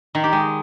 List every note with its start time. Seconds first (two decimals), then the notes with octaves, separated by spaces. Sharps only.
0.15 D#3
0.24 G4
0.33 G#3